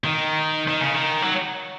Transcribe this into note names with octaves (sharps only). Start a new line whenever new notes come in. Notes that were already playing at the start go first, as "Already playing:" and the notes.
D#3
D#3
C#3
D#3
F#3